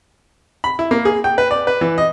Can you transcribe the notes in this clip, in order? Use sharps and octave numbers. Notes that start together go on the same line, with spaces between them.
B5
E4
A#3
G#4
G5
B4
D5
B4
E3
D#5